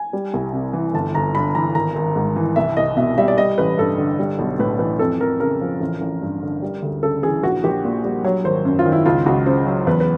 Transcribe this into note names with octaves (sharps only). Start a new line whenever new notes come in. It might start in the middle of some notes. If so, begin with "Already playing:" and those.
Already playing: G#5
G3
C2
C3
E3
G1 A5
G1 A#5
G2 B5
E3 A#5
G#1 A#5
G#1
G#2
E3
C2 E5
C2 D#5
B2 E5
G3 E5
D5
G3 D#5
A1 B4
G2 A4
D3
G3
B1
A2 B4
E3 B4
F2 A4
F2 A#4
C#3 A#4
F3
A1
A1
G2
D3
G3
D2
C#3 A4
E3 G#4
A#1 F#4
A#1 G4
A#2
G3
F#3 C#5
G#1 C5
F#2
F4
D#3
E4
C#2 F4
C#2 F#4
C#3 C5
F#3
E2 B4
B4